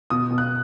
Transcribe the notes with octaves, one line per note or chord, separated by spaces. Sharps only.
B2 D#6
B2
F#6